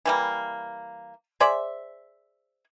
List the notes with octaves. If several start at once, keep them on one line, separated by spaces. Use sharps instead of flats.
E3 G3 A#3
G#4 C5 D5 E5